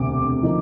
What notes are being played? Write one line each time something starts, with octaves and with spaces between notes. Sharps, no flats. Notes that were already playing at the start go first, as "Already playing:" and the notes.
Already playing: E1 D2 C3 D6
D3 F3 A#3 D#4